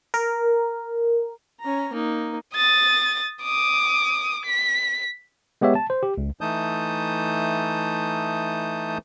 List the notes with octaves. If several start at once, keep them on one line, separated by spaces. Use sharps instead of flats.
A#4
C#4 A#5
A#3 D#4
D#6 A6
D6 D#6
B6
G#3 B3 G4 C#5 E5
A5
C5
G4
C#2
E3 A3 D#4 A5 D#6 G6